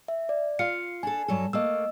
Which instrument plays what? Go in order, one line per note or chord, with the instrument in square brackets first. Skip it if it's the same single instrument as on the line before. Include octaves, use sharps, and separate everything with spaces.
[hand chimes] E5
D5
[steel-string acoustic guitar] F4 F5 [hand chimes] C#7
[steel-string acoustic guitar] D4 A4 [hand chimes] G#5
[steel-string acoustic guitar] G2 F#3 A4
[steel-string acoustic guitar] A3 A#3 [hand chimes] D#5 E6